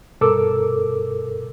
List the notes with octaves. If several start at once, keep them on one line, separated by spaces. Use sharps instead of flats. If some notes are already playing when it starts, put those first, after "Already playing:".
G2 B2 A4 A#4 D6 E6